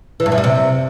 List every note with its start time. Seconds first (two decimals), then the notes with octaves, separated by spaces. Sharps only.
0.20 E3
0.26 G2
0.32 F#2
0.38 G3
0.44 C3